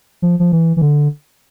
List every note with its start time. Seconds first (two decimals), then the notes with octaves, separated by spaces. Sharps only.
0.22 F3
0.39 F3
0.52 E3
0.77 E3
0.82 D3